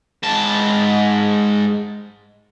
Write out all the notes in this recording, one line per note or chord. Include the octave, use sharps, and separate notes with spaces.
G#2 A5